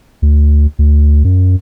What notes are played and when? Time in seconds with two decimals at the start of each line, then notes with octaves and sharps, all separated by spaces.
0.22 D2
0.79 D2
1.24 F#2